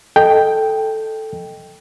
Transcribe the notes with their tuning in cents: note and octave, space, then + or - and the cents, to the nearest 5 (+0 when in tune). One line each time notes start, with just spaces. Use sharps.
A4 +0 D#5 +0 G5 +0